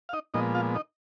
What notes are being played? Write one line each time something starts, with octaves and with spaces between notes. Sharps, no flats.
F5
D#4 D#5
A#2 F3 G#3 B3 D#4 D#5
F4 F5
D#4 D#5